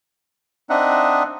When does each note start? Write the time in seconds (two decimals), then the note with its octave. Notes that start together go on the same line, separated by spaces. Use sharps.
0.70 C4 D4 D#4 D#5 E5 F#5